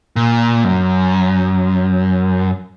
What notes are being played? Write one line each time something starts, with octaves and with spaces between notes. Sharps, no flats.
A#2
F#2